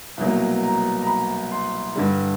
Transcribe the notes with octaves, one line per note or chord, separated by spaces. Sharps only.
C2 B2 F#3 A#3
A#5
A#5
B5
C6
G2 D3 G3